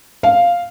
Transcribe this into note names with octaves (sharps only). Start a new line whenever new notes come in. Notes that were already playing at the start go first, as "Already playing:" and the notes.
F5